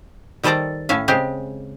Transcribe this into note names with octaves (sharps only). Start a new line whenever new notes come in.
D#3 G3 A4 C5 D5 A#5
A2 C#4 E5 F5
C#3 G#3 C4 G4 C5